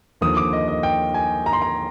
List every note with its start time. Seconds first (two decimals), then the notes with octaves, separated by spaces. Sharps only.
0.21 D#2 D3 F3 D#6
0.37 D6
0.53 D#5
0.68 D#5
0.83 G5
1.14 G#5
1.46 A#5
1.53 C6
1.62 A#5